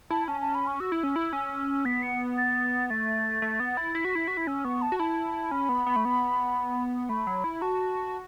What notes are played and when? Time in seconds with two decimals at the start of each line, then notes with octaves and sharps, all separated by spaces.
0.10 E4 A5
0.28 C#4 A5
0.41 A5
0.55 B5
0.67 C#6
0.80 F#4 E6
0.92 E4
1.03 C#4
1.16 E4
1.33 C#4
1.85 B3 B6
2.03 C#7
2.37 A6
2.89 A3 A6
3.42 A3
3.60 B3
3.77 E4
3.95 E4 B6
4.05 F#4
4.15 E4
4.28 F#4
4.37 E4
4.47 C#4 E6
4.65 B3 C#6
4.82 A5
4.92 F#4
4.99 E4 A5
5.51 C#4 B5
5.69 B3
5.86 B3
5.96 A3
6.05 B3
7.09 A3 B5
7.27 F#3
7.44 E4
7.62 F#4 A5